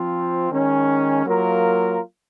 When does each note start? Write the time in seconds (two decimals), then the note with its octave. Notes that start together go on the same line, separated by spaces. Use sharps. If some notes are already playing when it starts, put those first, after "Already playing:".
Already playing: F3 C4 F4
0.52 D#3 G#3 C#4
1.25 F#3 A#3 F4 A#4